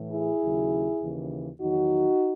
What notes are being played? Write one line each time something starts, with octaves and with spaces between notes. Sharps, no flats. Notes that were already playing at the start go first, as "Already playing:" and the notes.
Already playing: A2 E3
E4 G#4
D#2 C#3 F#3
D#2 C#3 E3
E2 D#3 F#3 D#4 F#4